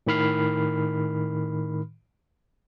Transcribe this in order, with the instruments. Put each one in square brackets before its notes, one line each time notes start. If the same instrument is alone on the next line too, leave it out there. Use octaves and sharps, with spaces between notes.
[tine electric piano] A2 D#3 B5 F6 C7